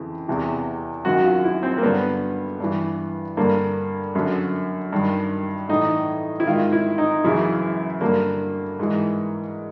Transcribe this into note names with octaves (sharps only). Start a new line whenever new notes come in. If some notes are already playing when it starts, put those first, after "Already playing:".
Already playing: F2 C#3 E3
E2 C3 E3
F#2 D#3 F#4
F4
E4
C4
A#3
G2 D3 B3
G2 E3
G2 D3 A#3
F#2 D3
G2 D#3
A2 E3 D#4
E4
G#2 D#3 F4
E4
D#4
F#2 C#3 E3 E4
G2 D3 A#3
G#2 E3